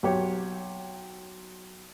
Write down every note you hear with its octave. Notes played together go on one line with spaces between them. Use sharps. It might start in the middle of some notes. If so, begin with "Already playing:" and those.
B1 G4 C#5